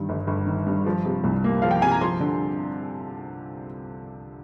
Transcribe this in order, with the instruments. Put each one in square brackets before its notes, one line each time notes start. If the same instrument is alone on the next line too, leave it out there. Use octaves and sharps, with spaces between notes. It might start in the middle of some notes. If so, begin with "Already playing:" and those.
Already playing: [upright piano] G2 D#3
G1
G1
D#3
G2
F3
C3
C2
A#3
F3 F5
G5
C3 G#5
A#5
F3 C6
D3